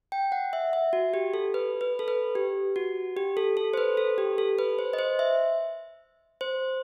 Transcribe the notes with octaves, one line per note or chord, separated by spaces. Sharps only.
G5
F#5
E5
E5
F#4
G4
A4
B4
B4
A4
B4
G4
F#4
G4
A4
A4
C5
B4
A4
G4
A4
B4
C5
D#5
C5
E5
C5